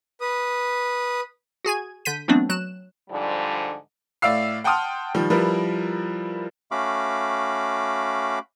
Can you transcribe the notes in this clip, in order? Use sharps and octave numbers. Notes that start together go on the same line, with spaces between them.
B4 D#6
F#4 G#4 G#5 G#6
D3 G6 B6 D#7
E3 F#3 A3 B3 C4 D4
F#3 F#6 E7
G#2 D3 F3 G3
A2 D5 E5 F5 E6 C7
F#5 G5 A5 C6 D#6 F6
D#3 F3 G3
F3 G3 E4 A#4 B4
A3 C#4 F#4 F5 B5 D6